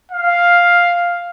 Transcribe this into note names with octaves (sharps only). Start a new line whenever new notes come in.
F5